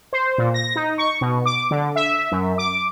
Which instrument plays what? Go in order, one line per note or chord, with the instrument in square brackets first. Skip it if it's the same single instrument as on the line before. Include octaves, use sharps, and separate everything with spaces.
[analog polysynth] C5
A#2
A#6
D#4
C#6
B2
D6
D3
E5
F#2
D6